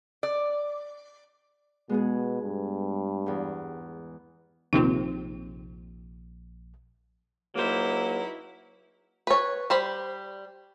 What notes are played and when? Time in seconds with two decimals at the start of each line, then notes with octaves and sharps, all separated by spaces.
0.23 D5
1.89 B2 G#3 B3 G#4
2.42 G2
3.26 E2 G#2
4.73 A#1 D#2 C3 C4 D#4 F4
7.56 C#2 F#3 A#3 D#4 E4 C5
9.27 B4 C#5
9.70 G3 C5 B5